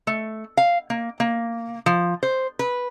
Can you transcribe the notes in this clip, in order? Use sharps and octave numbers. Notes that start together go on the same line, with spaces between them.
A3
F5
A#3
A#3
F3
C5
B4